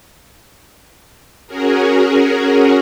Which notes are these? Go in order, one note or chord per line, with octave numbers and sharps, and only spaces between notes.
C#4 F#4 G#4 A#4